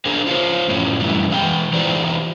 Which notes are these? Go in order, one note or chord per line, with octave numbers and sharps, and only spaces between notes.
D4 G#4 A#4 C5
F4 C5 C#5
F#2 A2 F3 C#4
F#2 C3 E3 G3
E3 G#3 F5 G5
E3 D#4 F4 G4 C5 D5